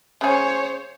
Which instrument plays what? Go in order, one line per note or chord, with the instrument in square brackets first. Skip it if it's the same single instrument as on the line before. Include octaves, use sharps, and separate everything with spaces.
[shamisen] C#3 G#4 [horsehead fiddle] C5 C#5